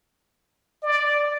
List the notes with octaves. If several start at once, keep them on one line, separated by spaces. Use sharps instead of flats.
D5